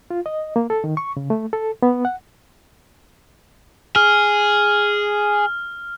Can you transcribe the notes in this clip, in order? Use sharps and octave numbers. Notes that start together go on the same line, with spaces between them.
F4
D#5
A#3
A4
D#3
C#6
C#3
A3
A4
B3
F#5
G#4 F6